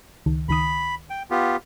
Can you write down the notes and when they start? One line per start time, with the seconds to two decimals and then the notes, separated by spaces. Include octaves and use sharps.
0.26 C#2 D#3
0.49 C#2 D#3 B5 D#6
1.10 G5
1.31 B3 F4 G4